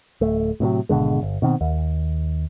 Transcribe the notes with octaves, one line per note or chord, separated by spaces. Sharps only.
D1 A3
A2 C3 D#3 F#3
G#1 B2 D3 G#3
G1
B2 D#3 C4
D#2